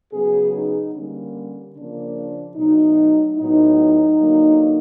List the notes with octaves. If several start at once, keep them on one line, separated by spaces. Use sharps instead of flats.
C#3 F#3 B3 G#4
D#4
D3 G3 A#3 C#4
C#3 F3 A#3 D4
B2 F#3 A3 D#4
A2 F#3 B3 D#4
D3 F#3 A#3